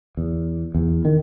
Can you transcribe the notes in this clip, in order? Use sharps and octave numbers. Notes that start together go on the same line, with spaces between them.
E2
E2
D#3